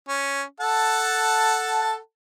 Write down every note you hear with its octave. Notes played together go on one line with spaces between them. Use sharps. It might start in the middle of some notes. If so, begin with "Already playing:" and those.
C#4
A4 F#5 A5